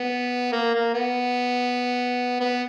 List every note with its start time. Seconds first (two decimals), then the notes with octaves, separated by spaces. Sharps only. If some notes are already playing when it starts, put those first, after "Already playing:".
Already playing: B3
0.52 A#3
0.74 A#3
0.94 B3
2.40 B3